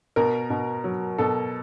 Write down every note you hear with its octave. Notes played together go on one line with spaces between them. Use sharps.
B2 A#4
B2
F#3
B2 A4